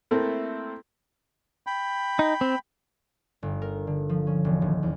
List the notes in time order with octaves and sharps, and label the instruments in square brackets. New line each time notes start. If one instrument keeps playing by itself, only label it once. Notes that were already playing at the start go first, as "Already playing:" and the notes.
[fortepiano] A3 A#3 C4 E4 A4 A#4
[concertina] G5 B5
[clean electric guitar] D#4
C4
[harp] G1
A#4
D3
F3
C#4
E1
D#1
E2